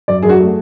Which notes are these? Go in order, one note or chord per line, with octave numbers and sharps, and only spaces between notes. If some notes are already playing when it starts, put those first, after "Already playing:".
F#2 D5
F#2 G#4
F#4
A3